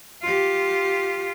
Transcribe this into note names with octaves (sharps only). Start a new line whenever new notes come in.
F4 G4